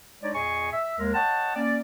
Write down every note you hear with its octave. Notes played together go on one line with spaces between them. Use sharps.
G#3 D4 D#4 C#5 D5
E2 A#2 G#4 D#5 G#5 C#6
E5
D#2 G#3 A#4
C#5 D#5 F#5 G5 A5
A#3 C#4 D5